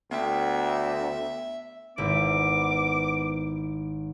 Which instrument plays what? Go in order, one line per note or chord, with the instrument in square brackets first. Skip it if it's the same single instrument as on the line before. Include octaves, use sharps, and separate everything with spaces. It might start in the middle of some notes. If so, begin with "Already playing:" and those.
[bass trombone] D2 [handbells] B3 G5 [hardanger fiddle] E5
[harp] G#1 E4 [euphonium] B3 [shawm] D6